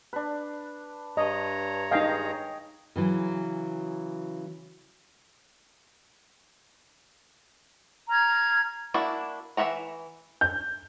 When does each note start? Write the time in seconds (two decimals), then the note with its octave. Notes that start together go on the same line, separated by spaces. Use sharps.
0.13 D4 B4
1.17 G2 C#5 D#5 A#5
1.91 D#4 G#4 D#5 F5 G5
2.96 C#3 E3 F#3
8.09 A#5 F6 G#6
8.94 A#3 D4 E4 F#4
9.57 E3 D4 E5 F#5 A#5
10.41 G6